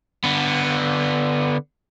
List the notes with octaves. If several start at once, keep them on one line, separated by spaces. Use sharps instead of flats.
D3 B3